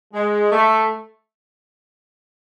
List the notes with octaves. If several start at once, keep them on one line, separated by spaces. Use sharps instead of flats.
G#3
A3